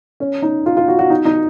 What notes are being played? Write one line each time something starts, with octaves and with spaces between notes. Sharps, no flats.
C#4
D#4
F4
F4
F#4
F#4
D#4
D#4